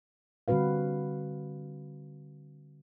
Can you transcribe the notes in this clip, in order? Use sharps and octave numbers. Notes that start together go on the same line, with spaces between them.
D3 G3 C4 F#4 B4 F5